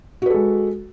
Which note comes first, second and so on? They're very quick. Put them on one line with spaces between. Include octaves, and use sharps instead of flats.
F#4 B4 A4 G#3